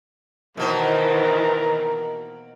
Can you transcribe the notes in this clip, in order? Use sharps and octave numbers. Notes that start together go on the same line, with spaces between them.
B2 D#3 E3 A#3 A#4 C5